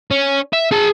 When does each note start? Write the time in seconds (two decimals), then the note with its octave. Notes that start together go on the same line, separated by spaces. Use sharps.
0.11 C#4
0.53 E5
0.72 G#4 A5